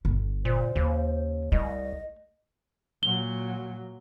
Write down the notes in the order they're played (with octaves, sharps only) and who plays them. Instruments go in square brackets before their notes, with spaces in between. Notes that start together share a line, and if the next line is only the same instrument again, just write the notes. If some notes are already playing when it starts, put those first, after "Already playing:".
[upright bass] G1 A3
[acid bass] A#2 [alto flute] C5
[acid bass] D#2 [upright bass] C#3
[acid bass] C2 [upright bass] A3 [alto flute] D#5
[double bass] A#2 F#3 [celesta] G7